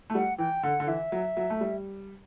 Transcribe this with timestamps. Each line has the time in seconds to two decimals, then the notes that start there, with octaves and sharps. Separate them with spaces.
0.10 A3
0.15 G3 F#5
0.38 E3 G5
0.63 D3 F#5
0.80 D3
0.87 E3 E5
1.12 F#3
1.37 F#3
1.50 A3
1.61 G3